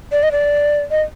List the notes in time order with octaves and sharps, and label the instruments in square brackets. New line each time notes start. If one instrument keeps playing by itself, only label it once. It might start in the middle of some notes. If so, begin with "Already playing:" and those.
[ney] D5
D#5
D5
D#5